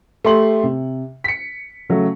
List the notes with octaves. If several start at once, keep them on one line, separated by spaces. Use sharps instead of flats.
A3 G4 C6 F#7
C3
B6 C#7
C#3 F#3 A3